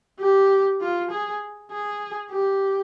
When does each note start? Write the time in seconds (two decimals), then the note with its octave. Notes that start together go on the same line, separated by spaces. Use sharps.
0.20 G4
0.81 F4
1.11 G#4
1.71 G#4
2.31 G4